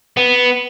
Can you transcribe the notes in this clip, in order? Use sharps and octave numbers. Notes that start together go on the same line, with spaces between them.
B3